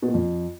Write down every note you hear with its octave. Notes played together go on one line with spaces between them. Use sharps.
B2
A#2
F2